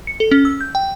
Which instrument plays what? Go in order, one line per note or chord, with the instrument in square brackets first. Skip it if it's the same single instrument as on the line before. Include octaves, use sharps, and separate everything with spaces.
[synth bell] C#7
A4
C#4
E6
G6
G5